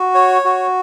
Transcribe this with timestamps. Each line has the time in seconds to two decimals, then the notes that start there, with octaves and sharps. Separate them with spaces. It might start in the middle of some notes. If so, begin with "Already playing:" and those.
Already playing: F#4
0.14 C#5
0.45 F#4